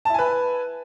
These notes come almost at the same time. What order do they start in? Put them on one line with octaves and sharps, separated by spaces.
A5 E4 G#5 B4